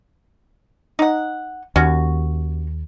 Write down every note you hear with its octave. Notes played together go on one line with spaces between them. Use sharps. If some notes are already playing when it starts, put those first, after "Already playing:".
D#4 F#5
D#2 C#4 F#4